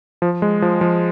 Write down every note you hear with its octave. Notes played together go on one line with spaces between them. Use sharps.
F3
G#3
F3
F3